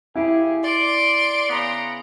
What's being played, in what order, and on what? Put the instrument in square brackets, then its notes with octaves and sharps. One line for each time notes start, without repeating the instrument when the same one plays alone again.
[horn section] F3 G4 G#4 [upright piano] E4
[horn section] D5 [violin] C6 D7
[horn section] C#3 B3 A#5